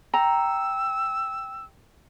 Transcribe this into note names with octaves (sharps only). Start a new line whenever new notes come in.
G5 A#5 E6